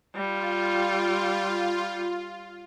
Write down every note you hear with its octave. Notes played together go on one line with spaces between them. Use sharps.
G3 F4